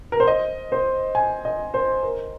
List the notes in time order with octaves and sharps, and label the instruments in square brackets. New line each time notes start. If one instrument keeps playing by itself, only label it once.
[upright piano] A#4
C5
D#5
C5
G#5
D#5
C5
A#4